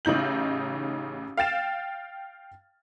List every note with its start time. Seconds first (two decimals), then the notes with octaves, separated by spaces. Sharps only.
0.05 A1 C#3 D#4 G6 F#7
1.37 F5 G5 A6 E7